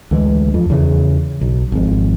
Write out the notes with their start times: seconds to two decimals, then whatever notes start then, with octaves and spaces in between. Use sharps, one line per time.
0.11 D2 E3 G#3
0.54 F2
0.70 E2 C#3 E3
1.41 B1
1.72 G#1 F2